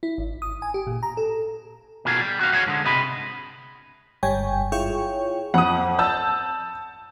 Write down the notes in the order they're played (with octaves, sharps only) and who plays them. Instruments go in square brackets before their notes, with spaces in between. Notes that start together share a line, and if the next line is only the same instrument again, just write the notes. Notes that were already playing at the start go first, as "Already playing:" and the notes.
[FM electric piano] E4
G#1
D#6
G#5
G4
A#2
A#5
A4
[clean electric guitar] B2 D#3 F4 G#4
G3
F#4 F5
F#4 G#4 C#5 D#5 F5 F#5
G#2 D3 G#3
C3 D#5 B5
[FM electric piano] G1 G#2 G3 C#5 G5 G#5
E4 F4 G#4 C#5 G5 C#6
[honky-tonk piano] F2 [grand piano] F#5 D#6
[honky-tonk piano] A5 E6 G6